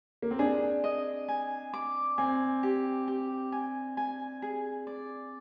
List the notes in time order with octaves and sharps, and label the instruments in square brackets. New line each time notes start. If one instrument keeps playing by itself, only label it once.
[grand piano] A#3
C4
[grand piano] D4 [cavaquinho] G#4
[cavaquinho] D#5
G#5
D6
[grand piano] C4 [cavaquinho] G#5
[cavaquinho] G4
G4
G#5
G#5
G#4
D5